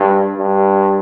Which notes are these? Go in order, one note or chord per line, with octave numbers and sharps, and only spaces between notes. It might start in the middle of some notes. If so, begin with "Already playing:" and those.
Already playing: G2
G2